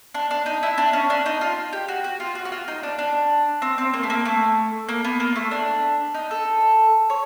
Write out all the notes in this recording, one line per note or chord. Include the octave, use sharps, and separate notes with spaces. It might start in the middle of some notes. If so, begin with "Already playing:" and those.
D4
D4
D#4
E4
D4
C#4
D4
D#4
F4
G4
F#4
F#4
F4
F#4
F#4
F4
D#4
D4
D4
C4
C4
A#3
A3
A#3
A3
A#3
B3
A#3
A3
D4
D#4
A4
C#5